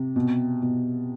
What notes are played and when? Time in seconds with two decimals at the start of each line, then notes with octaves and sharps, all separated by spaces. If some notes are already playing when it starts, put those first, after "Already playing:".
Already playing: C3
0.16 B2
0.62 B2